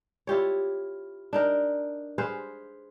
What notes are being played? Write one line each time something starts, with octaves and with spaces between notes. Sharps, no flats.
E4 F4 G4 C#5
D4 D#4 A#4
G#4 B4 C5 F5